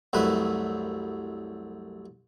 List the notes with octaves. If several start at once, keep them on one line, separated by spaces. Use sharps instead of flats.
C2 F#2 A3 B4